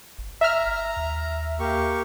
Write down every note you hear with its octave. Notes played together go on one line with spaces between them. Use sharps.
G1
E5 A#5 F6
D#2
A#3 G4 C#6